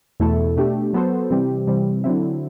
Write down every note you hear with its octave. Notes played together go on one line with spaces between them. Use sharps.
E2 B2 A3 E4 A4
B2 A3 D4 G4
F#3 B3 F#4 A4 C5
C3 E3 G3 C4 G4
C3 E3 G3 C4
D3 F#3 C4 E4